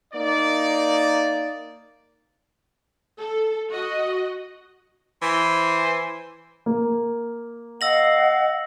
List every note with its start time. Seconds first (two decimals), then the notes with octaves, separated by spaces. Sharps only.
0.14 A#3 D#4 D5
3.19 A4
3.70 F#4 D#5
5.22 E3 C5
6.66 A#3
7.81 D#5 F5 F#5 E6 A#6 F#7